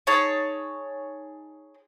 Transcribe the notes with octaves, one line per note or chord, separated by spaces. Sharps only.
D#4 G#4 C#5 A5